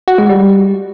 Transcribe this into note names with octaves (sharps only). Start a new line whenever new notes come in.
F#4
G#3
G3